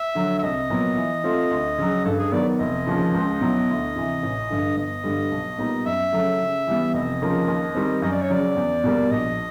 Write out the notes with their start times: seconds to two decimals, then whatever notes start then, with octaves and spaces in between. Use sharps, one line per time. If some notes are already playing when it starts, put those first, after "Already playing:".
Already playing: E5
0.15 D3 F#3
0.39 E5
0.43 C2 D#5
0.70 A#2 F#3 B3
0.97 E3
1.24 A3 C4 F4
1.51 D2
1.78 C#3 F#3
2.05 G2 A4
2.19 G#4
2.32 D#3 F#3 B3 D5
2.59 F1 D#5
2.87 D#2 C#3 F3
3.14 C#2
3.41 B2 F#3 B3 E4
3.69 D2
3.96 C3 E3
4.23 A1
4.50 G2 D3
4.77 G1 D#5
5.04 G2 D3 G3
5.32 B1
5.58 A#2 G3 B3 D#4
5.85 F#2 E5
6.13 C#3 F#3 A3
6.39 C#3
6.67 E3 G3 B3
6.93 F1 D#5
7.21 D#2 C#3 F3 A#3
7.48 D#2
7.75 D#3 G3 C4
8.02 F#2 D#5
8.12 D5
8.22 C#5
8.30 C#3 F#3 D5
8.56 E2
8.84 B2 G3 A#3
9.11 A#1 D#5